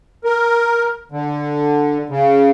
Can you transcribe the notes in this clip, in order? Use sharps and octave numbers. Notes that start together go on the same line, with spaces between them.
A#4
D3
C#3